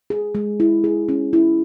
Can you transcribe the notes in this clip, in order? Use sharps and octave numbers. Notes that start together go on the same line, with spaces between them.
G#4
G#3
E4
G#4
C#4
E4